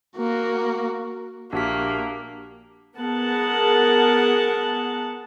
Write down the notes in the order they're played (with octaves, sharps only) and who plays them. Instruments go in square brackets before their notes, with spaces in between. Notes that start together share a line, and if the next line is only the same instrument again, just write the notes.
[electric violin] A#3 F#4
[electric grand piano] A#1 F#4 [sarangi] A#3 [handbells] D4 B6 [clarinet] G4
[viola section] B3 G#4 A#4 F#5 A5